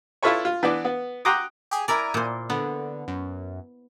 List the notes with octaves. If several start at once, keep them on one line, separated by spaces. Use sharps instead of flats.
E4 F4 A4 B4 C#5
F4
E3 B3 D4 D6
B3
F#5 G5 A#5 C6 D6 D#6
G4 G#4
E4 A#4 D5 G#5 A#5
A#2 C5
D3 B3
F#2